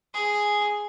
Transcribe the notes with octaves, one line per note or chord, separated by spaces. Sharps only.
G#4